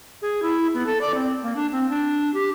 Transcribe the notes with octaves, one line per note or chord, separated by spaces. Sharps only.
G#4
E4
B3
A4
D5
C4
A#3
D4
C4
D4
G4